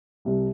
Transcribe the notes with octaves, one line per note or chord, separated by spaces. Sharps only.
C2 C3 G3